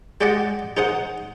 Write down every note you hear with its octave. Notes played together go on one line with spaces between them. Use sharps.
G#3 G4 D5 D#5 F#5 G#5
D#4 G#4 C5 F#5 D#6